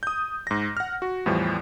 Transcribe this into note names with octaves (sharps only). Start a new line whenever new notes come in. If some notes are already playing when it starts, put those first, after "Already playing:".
D#6 G6
G#2 A#6
F#5 F6
F#4
E2 A2 E3 F3 G3